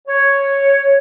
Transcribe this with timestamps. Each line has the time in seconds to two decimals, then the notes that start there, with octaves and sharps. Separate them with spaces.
0.08 C#5